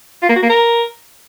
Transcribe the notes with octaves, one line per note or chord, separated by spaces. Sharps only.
F4
A#3
F#4
A#3
A#4